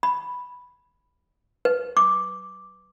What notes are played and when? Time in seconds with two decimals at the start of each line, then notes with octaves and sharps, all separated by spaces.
0.03 B5
1.65 B4
1.97 D6